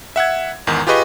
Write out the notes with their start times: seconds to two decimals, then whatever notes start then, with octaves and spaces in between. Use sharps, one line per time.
0.16 E5 F#5 E6 G#6
0.67 E2 G#2 D#3
0.87 F4 G4 G#4 B4 D#5 C#6